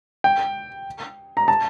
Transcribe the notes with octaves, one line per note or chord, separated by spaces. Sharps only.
G5
A#5
A5